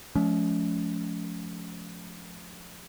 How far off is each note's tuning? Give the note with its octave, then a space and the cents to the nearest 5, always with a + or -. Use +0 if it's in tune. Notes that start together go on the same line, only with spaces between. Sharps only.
F3 +0 A3 -45 C#4 +30